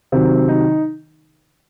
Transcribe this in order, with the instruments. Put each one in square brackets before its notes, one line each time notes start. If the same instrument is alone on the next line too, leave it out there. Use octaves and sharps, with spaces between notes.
[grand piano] C3 D#3 F#3 C4
D#4